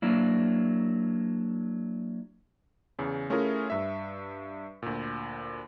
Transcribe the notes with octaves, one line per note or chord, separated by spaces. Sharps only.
F#3 A#3 D4 E4
E2 C#3
A3 C#4 E4 F4 G#4 A#4
G2 E5
D2 A#2